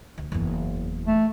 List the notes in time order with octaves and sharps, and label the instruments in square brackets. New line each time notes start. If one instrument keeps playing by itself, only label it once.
[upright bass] D2
F#1 E2
[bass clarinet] A3